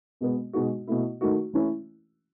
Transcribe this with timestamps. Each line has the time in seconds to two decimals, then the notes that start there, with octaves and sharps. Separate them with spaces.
0.21 B2 G#3 B3
0.53 B2 G#3 D#4 F#4
0.87 B2 A3 E4
1.21 D#3 A3 D#4 F#4
1.53 E3 A3 C#4 E4